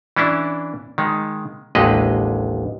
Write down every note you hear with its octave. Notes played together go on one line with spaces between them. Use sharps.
E3 C#4 D4 E4
D#3 G#3
A1 D#2 D3 G#3 B4 D#5